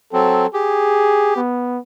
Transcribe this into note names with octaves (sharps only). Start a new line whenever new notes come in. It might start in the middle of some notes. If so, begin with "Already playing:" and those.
F#3 C4 A4
G4 G#4
B3